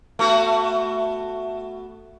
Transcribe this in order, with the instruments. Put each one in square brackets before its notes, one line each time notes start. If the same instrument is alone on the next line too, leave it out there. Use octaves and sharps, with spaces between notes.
[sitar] A3 B3 F#4